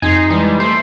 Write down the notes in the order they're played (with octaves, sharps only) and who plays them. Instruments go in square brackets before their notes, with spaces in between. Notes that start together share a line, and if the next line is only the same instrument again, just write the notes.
[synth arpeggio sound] F2 [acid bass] D#4 [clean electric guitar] G#4 C5 G#5
[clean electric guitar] E3 G#3 D#4 [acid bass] G3
[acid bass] A3 [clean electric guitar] C5